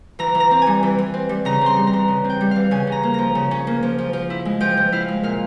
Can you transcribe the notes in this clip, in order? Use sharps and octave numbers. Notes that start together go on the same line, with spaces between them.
E3 A#5
E3
A#5
C4
G#5
G3
E3
E3
C4
G3
C#3 A#5
C4 C6
G3
A#5
E3
C#3
C4
G5
G3
E3 F5
C#3 G#5
C#4 A#5
A#3
F3 A#5
C#3
C#4
A#3
F3
F3
F3
E4
G#3
F3 G5
F3
E4 F5
G#3
A#2 F5